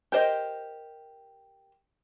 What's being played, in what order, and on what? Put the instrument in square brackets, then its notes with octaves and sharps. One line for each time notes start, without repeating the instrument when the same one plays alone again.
[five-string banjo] G4 A#4 C5 D#5